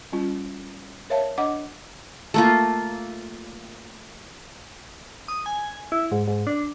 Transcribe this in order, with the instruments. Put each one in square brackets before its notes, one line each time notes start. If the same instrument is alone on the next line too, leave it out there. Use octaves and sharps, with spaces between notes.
[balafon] G3 C#4 F4
A#4 C#5 E5 F5 A5
D4 D#5 F#5 D6
[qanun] A3 A#3 F4
[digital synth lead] D#6
G#5
E4
G#2
G#2
D4